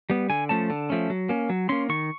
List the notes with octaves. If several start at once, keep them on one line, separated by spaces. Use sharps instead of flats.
G3 B3
D3 G#5
F3 A3 C#4 A5
D3
F3 A3 C#4
F#3
A#3 C#4
F#3
A#3 C#4 C6
D#3 C#6